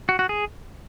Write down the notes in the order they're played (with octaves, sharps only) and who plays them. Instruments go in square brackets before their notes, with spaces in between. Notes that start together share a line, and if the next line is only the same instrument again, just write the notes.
[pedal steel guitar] F#4
F#4
G#4